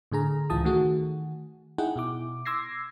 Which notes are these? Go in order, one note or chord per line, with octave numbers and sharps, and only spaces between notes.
A2 D3 G#4 A#5
C#2 E3 F4 A5 D#6
D#3 A3 F#4 G#4
D#4 E4 G#4 F#5 G5
B2 E4 D6
C6 D6 E6 G#6 A#6 C7